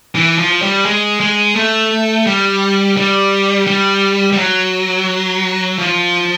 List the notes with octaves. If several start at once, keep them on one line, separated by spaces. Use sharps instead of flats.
E3
F3
G3
G#3
G#3
A3
G3
G3
G3
G3
F#3
F3